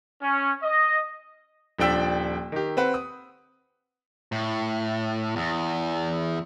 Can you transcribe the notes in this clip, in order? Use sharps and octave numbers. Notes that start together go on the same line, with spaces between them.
C#4
D#5
D#1 F3 D4 G5 E6 B6
D#3 G4
C4 B4 F#5
D#6
A2
E2